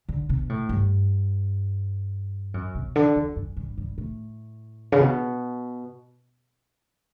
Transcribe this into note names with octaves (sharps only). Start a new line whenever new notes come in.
D3
B2
A2
G2
F#2
B2
D3
E2
F#2
G2
G2
A2
C#3
B2